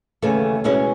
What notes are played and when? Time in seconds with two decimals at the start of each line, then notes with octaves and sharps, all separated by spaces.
0.22 D#2 C#3 E3 A3
0.64 B2 G#3 C#4 E4